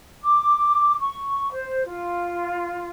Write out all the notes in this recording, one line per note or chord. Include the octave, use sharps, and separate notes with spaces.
D6
C#6
C5
F4